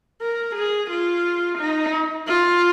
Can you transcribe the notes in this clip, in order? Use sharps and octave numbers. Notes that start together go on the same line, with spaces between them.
A#4
G#4
F4
D#4
F4